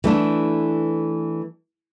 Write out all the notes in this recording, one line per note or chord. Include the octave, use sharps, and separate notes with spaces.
E3 A3 D4